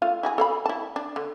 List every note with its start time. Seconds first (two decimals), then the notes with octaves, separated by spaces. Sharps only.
0.02 A3 F4 F5
0.23 E4 F#4 G#4
0.38 A4 F5 B5
0.66 E4 A5
0.96 D4
1.16 D3